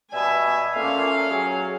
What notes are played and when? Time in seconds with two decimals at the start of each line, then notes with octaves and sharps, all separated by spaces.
0.12 B2 G3 E5 G#5
0.76 A#2 A3 C#4 F5
1.30 F#3 G#4